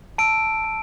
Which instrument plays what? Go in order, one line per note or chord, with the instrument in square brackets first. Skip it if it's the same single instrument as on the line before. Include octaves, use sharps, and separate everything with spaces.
[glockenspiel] A5 E6 D7
A5